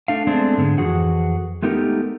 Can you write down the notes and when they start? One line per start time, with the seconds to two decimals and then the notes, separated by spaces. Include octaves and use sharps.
0.08 A3 D4 F5
0.27 G#3 A3 B3 C4 D4
0.58 G#2 D3 G#3
0.78 F2 E3 F#4 G#4 F#5
1.62 G#3 A3 B3 D#4 G4 A#4